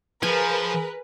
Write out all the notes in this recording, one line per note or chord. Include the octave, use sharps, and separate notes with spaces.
F3 G#4 A#4 B4 G#5